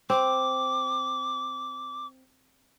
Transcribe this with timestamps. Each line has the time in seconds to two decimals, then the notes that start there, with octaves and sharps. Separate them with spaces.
0.10 C4 D6